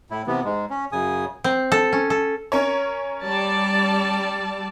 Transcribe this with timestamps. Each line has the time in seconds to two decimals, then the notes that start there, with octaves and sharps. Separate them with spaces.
0.10 A2 E4
0.27 C3 E3 B3
0.44 G#2 G#3
0.70 C#4
0.92 F#2 C#3 G#5 D#6
1.44 C4
1.72 A4
1.93 C#4
2.10 A4
2.52 C#4 A#4 C#5
3.24 G3 D5 A5